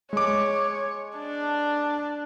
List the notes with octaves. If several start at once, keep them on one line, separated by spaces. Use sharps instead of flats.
G#3 C#5 D6
D4